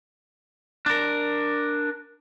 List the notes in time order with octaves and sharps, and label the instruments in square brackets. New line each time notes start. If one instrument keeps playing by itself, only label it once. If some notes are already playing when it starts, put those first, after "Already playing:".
[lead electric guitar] D4 A#4